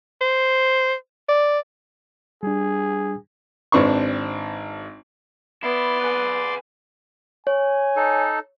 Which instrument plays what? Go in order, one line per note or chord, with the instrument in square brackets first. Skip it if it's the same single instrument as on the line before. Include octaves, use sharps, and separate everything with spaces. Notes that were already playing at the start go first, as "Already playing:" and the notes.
[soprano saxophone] C5
D5
[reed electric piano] G3 D4 [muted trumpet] G#4
[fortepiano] G#1 C4 D4 B4 C#6
[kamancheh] B3 [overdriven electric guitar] E4 [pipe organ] D5 C6
[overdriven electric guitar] G#4 B4
[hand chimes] C#5 [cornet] G#5
[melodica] D#4 A4